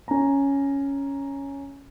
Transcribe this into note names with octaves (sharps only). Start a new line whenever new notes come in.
C#4 A#5